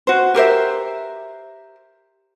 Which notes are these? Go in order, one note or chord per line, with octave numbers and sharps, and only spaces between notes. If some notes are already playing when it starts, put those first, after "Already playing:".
F#4 C5
G4 A#4 C5 E5